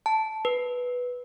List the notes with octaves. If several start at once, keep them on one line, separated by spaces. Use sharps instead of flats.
A5
B4